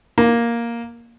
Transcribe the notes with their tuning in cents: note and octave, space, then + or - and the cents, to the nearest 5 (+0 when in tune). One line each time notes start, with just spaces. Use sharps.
A#3 +5